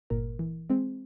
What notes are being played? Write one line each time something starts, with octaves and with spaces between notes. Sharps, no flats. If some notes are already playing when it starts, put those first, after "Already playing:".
G1 A#2 A#4
E3
G#3 C4